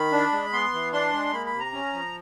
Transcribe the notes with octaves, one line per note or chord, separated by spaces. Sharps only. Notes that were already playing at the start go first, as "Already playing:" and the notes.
Already playing: D#3 B5
D4
G#3
B3 C6
E3
D4 C6
G#3
A#3 B5
B5
C3
A#5
C#4
F3